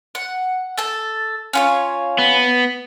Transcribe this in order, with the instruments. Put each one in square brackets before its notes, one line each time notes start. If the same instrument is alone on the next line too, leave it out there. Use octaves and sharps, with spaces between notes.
[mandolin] F#5
A4 A5
C#4 F4 C#5
[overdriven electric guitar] B3